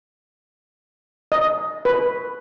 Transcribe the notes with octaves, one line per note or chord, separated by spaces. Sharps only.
D#5
B4